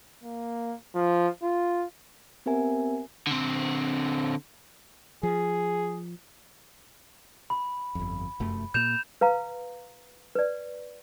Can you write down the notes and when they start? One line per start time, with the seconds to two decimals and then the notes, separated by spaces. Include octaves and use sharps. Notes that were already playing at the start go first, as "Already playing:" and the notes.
0.24 A#3
0.95 F3
1.43 F4
2.46 B3 C4 G4 A#4 E5 G#5
3.27 D3 C4
5.23 F3 G#4
7.50 B5
7.95 G1 F2
8.40 F1 F#2 A3
8.74 A#2 A#3 G6 E7 F7
9.21 B4 F5 A#5
10.35 B4 D5